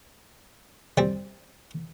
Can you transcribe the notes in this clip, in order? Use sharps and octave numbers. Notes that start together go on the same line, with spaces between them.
G3 C4